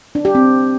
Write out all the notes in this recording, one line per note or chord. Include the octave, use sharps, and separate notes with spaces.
D4
G4
C4